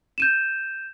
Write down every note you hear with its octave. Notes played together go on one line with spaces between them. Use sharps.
G6 D#7 E7